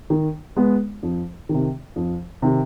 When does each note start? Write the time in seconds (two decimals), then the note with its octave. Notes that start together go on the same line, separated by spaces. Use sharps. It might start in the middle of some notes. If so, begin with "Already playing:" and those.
0.10 D#3
0.56 G#3 B3
1.03 F2
1.49 C3 D#3
1.96 F2
2.42 C3 D#3